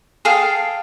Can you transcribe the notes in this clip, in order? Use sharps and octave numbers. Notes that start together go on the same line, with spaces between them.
G#4 A4 F5 G5